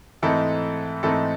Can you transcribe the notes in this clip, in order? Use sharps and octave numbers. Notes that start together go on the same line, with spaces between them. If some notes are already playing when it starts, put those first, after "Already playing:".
G#2 E3 A3 C4 D#4 A4
G#2 E3 A3 C4 D#4 A4